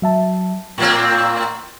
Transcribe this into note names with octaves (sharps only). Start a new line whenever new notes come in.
F#3 E5 A5
A2 A#3 C4 A#5 C#6